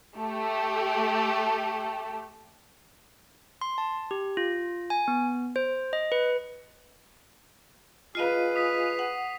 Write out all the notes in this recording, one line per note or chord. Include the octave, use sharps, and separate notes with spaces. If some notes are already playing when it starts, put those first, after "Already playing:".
A3 G4
C6
A5
G4
F4
G#5
B3
C5
D#5
B4
F4 G#4 B4 D#5 F5 C7 D#7
D#6 B6 F7
F#5